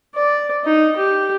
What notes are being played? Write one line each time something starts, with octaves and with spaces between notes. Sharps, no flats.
D5
D#4
G4